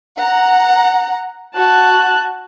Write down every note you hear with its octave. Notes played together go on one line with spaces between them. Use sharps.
F#5 A#5
F#4 A5 F#6